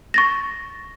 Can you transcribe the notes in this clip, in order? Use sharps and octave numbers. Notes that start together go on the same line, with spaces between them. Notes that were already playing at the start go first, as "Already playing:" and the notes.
C#6 A6 A#6